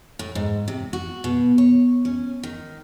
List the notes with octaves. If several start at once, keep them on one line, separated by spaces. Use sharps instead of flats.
A2
G#2
C3
F#4
B2
C#5
C#4
D#3